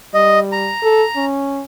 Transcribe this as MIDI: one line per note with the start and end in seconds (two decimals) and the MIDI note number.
0.14 0.70 55
0.14 0.39 75
0.52 1.25 82
0.83 1.03 69
1.16 1.62 61